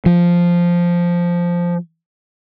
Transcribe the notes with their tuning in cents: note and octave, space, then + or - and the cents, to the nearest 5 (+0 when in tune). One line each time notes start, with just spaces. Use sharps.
F3 -5